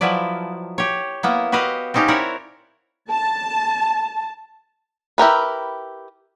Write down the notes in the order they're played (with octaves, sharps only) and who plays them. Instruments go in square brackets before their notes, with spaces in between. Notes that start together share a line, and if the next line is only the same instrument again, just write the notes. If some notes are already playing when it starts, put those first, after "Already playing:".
[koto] F3 F#3 E4 B4 D5
G4 C#5
A#3 B3 E4
F#4 G4 B4 D#5 F5
C4 C#4 D#4 G4 F5
C4 E4 A#4 C#5 D5 F#5
[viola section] A5
[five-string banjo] E4 G4 A#4 B4